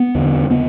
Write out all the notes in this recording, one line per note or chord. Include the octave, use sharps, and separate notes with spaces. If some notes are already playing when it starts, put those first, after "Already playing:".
Already playing: B3
E2 D3
C#3 B3